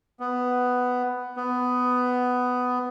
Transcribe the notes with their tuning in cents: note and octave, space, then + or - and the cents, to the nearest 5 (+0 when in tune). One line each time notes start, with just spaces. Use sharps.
B3 +5
B3 +10